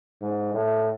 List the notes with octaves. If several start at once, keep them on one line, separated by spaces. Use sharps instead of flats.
G#2
A2